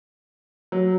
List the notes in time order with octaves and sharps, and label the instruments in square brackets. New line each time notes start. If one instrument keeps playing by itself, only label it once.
[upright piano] F#3